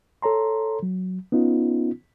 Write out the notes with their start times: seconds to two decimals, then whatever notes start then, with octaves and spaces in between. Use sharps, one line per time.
0.22 A4 C#5 A#5 C6
0.83 F#3
1.32 B3 C#4 D#4 F4